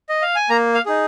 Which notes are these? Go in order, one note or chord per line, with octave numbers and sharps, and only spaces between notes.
D#5
F5
G#5
A#3 A#5
F5
D#4 G#4